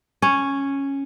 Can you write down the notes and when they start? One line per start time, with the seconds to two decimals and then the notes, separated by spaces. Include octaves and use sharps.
0.22 C#4